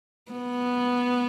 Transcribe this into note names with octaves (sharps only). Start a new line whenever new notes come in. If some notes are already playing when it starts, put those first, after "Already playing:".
B3